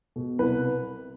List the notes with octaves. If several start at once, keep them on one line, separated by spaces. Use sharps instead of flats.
B2
C2 B4